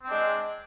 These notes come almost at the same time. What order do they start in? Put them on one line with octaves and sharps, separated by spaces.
C4 D4 G#3